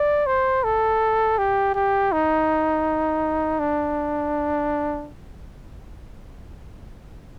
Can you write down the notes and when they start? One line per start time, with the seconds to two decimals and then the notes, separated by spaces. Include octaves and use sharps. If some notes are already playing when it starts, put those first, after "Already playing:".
Already playing: D5
0.27 C5
0.64 A4
1.38 G4
1.75 G4
2.12 D#4
3.59 D4